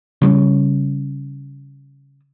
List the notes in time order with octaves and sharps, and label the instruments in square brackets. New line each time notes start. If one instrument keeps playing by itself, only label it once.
[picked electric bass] C#3 G3 B3 C#4